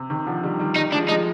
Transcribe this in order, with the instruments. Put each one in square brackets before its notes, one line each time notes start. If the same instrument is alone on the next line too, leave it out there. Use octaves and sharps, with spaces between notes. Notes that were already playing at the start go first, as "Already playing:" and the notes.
Already playing: [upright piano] C3
C3 D#3
D3 F3
D#3 G3
D#3 G3
[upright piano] D#3 G3 [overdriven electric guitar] D#4
[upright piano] F3 G#3 [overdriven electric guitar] D4
[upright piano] F3 G#3 [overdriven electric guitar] D#4